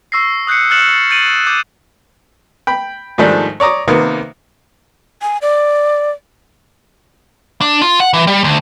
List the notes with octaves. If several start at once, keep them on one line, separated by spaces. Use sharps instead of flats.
C#6 E6 A#6 C7
D#6 F#6 G6 C7 C#7
F6 F#6 A6 C#7 E7 F#7
A6
G6 A6 D7 D#7 F#7
D6 G6
G5 B5
G#2 D#3 F3 G3 A3 D4
C#5 D5 A#5 D#6
C3 D#3 A#3 B3
G#5
D5
D4
F4
F#5
E3
G3
D2